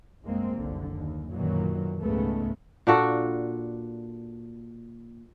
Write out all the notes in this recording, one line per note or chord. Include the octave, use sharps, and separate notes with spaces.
F#1 C2 G#3 A#3 C4
F#1 C2 D3
D#2
B1 F#2 A#2 D#3 E3 F#3
C#2 G#2 C#3 G#3 A3 B3
A#2 D4 F#4 A4